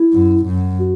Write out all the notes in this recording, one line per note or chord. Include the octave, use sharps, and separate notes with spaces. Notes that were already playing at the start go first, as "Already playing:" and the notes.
Already playing: E4
F#2
F#2
F#4